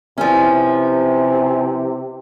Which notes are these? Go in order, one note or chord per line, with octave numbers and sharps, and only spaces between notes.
C3 F3 C#4 E4 B4 E5